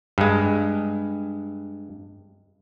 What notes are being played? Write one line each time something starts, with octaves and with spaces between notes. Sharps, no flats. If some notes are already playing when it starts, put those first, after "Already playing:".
G2 G#3